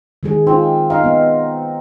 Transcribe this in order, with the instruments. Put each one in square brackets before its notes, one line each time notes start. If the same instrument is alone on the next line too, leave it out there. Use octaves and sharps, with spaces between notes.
[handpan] D#3 G#3 G#4
[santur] C4 [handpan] D#4 F4
[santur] D#4 [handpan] F5
[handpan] B3